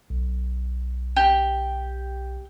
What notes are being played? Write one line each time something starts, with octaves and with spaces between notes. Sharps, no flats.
B1
G4